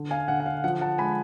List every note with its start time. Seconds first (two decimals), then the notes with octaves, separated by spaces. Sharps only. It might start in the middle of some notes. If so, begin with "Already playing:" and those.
Already playing: D3
0.11 F5 G#5
0.28 D3 F#5
0.40 F#5
0.46 F5
0.64 F3 F#5
0.81 F#5 A5
0.98 G#3 G#5 B5